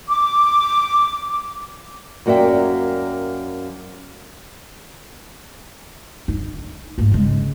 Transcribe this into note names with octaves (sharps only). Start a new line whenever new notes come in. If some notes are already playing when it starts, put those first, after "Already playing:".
D6
F#2 A#3 F#4 D5 E5 G5
D#4
G#2 A#3
C#3 G#3